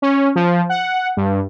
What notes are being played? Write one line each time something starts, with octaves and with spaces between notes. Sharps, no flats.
C#4
F3
F#5
G2